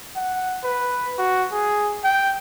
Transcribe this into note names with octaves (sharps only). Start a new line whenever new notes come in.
F#5
B4
F#4
G#4
G5